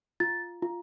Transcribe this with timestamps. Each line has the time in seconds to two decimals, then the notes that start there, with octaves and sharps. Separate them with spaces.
0.20 F4 A6
0.62 F4